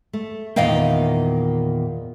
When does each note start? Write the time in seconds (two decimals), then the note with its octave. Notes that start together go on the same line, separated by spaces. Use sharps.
0.13 A3
0.56 E2 A#2 D#3 D#5 F5 G5